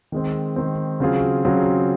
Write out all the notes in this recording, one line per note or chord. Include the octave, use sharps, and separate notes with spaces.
D#3 G#3 C4
D#3 G#3 C4
C#3 F#3 C4 F4 G#4
C#3 F#3 C4 F4 G#4